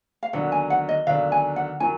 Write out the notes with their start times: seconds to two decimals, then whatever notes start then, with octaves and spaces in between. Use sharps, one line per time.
0.23 F5
0.33 D#2 D3 F#3 B3 D4 F#5
0.52 G#5
0.70 F#5
0.89 D#5
1.07 D#2 D3 F#3 B3 D4 F5
1.32 G#5
1.56 F#5
1.80 D#3 F#3 G#5